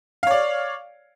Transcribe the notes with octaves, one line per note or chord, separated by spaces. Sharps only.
C#5 D5 F5